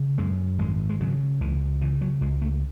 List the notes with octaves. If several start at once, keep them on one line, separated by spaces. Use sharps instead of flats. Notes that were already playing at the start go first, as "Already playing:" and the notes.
Already playing: C#3
F#2 G#3
G#1 G#3
G#3
C#3 F#3
C#2 E3
C#3 E3
F#3
C#2 G#3
A3